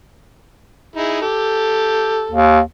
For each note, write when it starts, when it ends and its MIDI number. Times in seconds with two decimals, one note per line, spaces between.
0.96 1.21 63
0.96 1.21 64
0.96 1.21 68
1.22 2.35 67
1.22 2.35 69
2.31 2.60 39